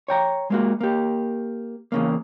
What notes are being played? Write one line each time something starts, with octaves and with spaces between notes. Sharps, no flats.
C#5 G5 A#5
G#3 A#3 F#4
A#3 G4
E2 C#3 A#3